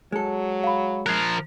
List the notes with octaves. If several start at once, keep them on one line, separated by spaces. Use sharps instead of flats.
F#3 G#3 A4
F5 B5
F3 A#4 F#6 G#6 C7